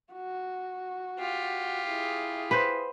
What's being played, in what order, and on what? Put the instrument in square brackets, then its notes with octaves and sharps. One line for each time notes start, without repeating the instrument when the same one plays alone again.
[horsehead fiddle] F#4
[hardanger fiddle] F4 G4
[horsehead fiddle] E4 G#4
[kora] B4 C5